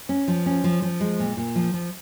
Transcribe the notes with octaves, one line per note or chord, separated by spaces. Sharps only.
C#4
F3
C#4
F3
F3
G#3
A#2
A#2
F3
F3